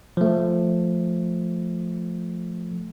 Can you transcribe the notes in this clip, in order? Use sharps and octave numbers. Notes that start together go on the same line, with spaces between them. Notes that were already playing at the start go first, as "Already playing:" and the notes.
F3 A3